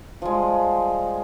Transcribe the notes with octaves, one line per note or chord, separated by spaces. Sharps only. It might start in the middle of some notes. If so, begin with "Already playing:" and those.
F3 G3 G#3